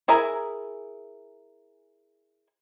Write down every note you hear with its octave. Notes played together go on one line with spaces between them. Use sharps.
E4 G#4 A#4 E5 A#5